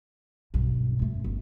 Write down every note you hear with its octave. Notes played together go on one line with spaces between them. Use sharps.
B1 G2
F#2 A3
G1